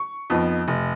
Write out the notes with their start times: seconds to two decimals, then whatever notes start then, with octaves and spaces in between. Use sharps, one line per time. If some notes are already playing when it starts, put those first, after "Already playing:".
Already playing: C#6
0.30 F2 F3 B3 D#4
0.68 F1